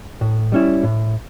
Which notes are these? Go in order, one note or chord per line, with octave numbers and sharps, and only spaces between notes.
A2
G3 C#4 E4
A2